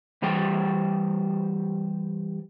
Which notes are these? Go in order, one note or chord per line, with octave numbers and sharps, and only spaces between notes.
E3 G3 G4 C5 G5